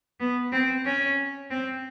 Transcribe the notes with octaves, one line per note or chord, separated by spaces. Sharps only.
B3
C4
C#4
C4